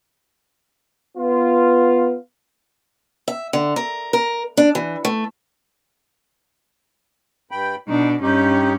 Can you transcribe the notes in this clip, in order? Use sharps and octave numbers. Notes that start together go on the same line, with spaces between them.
B3 F4
E5
D3
A#4
A#4
D4
E3
A3
G2 G5 B5
B2 D4 D#4
G2 C#4 D#4 G4